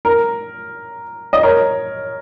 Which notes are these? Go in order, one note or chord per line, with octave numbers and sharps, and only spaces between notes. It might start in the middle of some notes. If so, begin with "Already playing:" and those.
A#4
D#5
A#4 C#5